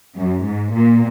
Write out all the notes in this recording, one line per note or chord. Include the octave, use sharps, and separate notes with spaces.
F#2
G#2
A#2